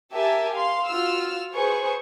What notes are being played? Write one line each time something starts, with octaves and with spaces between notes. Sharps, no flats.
G4 A#4 E5 G#5 A5
F5 C6
F4 F#4 E6 F6
G#4 B4 C5 C#6